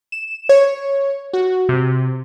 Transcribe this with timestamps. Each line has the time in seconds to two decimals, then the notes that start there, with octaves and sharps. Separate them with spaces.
0.12 E7
0.49 C#5
1.33 F#4
1.69 C3